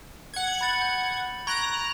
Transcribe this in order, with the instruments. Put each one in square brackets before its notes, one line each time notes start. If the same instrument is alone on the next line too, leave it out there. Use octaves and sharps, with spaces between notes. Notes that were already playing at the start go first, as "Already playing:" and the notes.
[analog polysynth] F#5 G#6
[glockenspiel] B5 A6 F#7
G6
[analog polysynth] A#5 F#6 A#6 [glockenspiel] C#6 G#6 D7